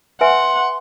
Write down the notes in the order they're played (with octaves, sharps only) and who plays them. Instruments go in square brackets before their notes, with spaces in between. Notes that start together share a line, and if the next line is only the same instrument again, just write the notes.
[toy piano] B4 E5 G#5 [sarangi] F#5 [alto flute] C6